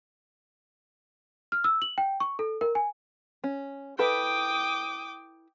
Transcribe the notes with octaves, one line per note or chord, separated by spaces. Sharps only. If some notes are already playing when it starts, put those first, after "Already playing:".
F6
E6
F#7
G5
C#6
A4
A#4
G#5
C#4
E4 A4 B4 G5 D6 D#6